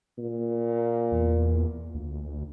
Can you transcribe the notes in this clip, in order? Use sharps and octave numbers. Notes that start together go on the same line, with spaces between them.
A#2
E2
D2